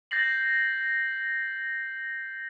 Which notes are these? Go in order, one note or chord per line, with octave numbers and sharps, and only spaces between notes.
G6 A6 A#6 C7 F#7